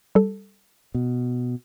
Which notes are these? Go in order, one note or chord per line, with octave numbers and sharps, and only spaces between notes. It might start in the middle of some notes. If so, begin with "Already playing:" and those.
G3 A4
B2